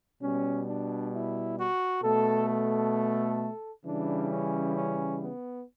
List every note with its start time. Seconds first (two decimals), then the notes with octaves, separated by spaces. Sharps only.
0.21 B2 G3 C#4
0.67 D4
1.13 E4
1.58 F#4
2.03 B2 A3 A4
2.49 A4
3.85 C#3 E3 G3 D4
4.30 C#4
4.75 C#4
5.21 B3